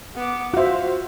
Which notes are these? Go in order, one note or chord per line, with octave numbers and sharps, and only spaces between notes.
B3 D6
F4 F#4 C5 E5 F5